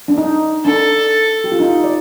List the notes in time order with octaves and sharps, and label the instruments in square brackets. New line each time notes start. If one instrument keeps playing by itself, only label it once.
[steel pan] D4
D#4
[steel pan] D4 [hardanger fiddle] A4
[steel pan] G4
F4
D#4
D5